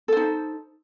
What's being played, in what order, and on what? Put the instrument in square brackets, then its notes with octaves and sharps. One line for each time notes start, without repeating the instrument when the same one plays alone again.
[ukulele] A4
C5
D#4